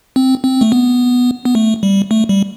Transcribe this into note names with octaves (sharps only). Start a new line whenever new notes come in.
C4
C4
A3
B3
B3
A3
G3
A3
G3